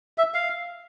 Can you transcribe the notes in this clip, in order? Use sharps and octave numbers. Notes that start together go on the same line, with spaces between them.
E5
F5